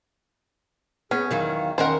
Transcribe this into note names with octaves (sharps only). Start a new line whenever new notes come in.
B3 C#4 G#4
E2 D#3 F#3 F5
E2 D#3 C#4 A#4 C5 F#5